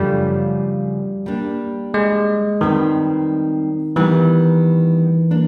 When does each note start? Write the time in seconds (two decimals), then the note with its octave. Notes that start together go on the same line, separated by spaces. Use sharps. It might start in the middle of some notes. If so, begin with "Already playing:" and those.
Already playing: F#2 C#3 F3 G3 A3 D4
1.26 G3 A#3 D4
1.94 G#3
2.61 D#3 G3 C4 D#4 F#4 B4
3.96 D#3 E3 G3 B3
5.31 A#3 D4